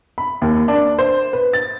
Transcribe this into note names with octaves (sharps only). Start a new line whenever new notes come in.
B5
D#2
D4
C5
B4
A6